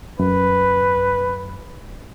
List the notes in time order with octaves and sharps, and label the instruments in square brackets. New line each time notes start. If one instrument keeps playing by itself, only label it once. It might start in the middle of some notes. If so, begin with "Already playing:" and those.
[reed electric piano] F#2 [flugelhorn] B4